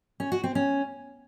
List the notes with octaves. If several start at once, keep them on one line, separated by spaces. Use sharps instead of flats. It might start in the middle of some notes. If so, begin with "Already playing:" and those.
C#4
F#4
C4
C#4